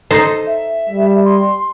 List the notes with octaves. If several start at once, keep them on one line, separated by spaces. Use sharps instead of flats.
D#4 A4 C5
E5
G3
C6